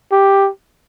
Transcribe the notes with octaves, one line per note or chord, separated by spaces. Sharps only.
G4